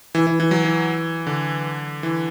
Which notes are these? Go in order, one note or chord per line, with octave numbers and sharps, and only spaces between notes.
E3
E3
E3
F#3
E3
D3
E3